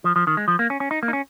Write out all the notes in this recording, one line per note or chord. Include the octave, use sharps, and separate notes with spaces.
F3
F3
D#3
G#3
F3
A#3
C#4
C#4
D#4
A#3
D#4
C#4